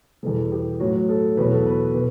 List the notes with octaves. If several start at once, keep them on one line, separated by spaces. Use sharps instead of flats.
E2 B2 G3 A4
G4
A2 F#3 F#4
A4
E2 B2 F#3 B4
A4
B4
B2